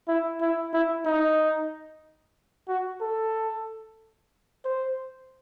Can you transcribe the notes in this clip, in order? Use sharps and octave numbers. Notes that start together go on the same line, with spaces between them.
E4
E4
E4
D#4
F#4
A4
C5